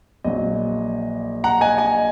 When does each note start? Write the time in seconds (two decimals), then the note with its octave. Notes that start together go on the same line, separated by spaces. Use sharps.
0.24 A#1 A#2 F#3 D#5
1.44 F#5 A#5
1.61 D#5 G#5
1.78 D#5 G#5